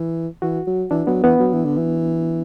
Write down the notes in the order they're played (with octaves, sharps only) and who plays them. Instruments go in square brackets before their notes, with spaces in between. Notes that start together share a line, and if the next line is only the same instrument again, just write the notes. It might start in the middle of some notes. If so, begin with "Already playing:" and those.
Already playing: [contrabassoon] E3
[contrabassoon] E3 [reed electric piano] F#4
[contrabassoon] F#3
[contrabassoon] E3 [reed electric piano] D4
[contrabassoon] F#3 [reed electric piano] B3
[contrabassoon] E3 [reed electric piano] B3
[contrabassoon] F#3
E3
D3
E3